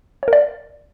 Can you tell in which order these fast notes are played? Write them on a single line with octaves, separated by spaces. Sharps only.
C#5 A#4 D5